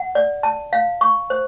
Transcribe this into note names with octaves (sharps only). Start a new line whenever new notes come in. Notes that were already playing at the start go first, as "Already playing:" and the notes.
Already playing: F#5
D5
A5
F5
C#6
C5